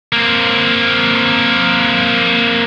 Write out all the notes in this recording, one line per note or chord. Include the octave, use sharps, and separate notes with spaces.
A#3 C4